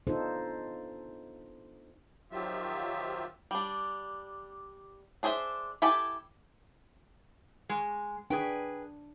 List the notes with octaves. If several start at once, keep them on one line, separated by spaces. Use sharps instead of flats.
B3 D4 D#4 F4 A4 C5
D#3 F3 F#3 F4 G4 E5
G3 D4
D4 G#4 C5 D5 E5
E4 G4 A4 G#5 A5
G#3
D4 G#4 B4 G5